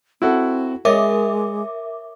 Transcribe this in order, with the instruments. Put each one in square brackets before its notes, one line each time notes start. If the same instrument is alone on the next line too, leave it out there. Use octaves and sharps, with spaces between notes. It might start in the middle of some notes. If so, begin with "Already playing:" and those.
[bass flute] C4 [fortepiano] E4 F#4 A4
[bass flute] G#3 [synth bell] A#4 E5 D6 [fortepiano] C#5 D#5